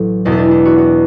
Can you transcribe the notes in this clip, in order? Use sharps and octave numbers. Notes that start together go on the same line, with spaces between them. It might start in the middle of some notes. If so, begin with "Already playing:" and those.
Already playing: A1 A2 F#3
E1 E2 B2
E4
D4
E4
F#4
F#4